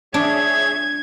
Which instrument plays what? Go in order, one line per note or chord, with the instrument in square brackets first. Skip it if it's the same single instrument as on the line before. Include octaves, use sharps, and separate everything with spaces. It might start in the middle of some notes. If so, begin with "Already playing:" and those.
[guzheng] D4 [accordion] G#4 C#5 E5 [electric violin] G#6